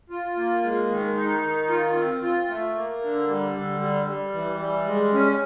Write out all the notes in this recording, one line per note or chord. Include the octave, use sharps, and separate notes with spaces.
F4
A#3
G#3
D#3
D#4
D#3
F4
C4
F4
A3
A#3
D3
G3
D3
G3
G3
E3
G3
G#3
C#4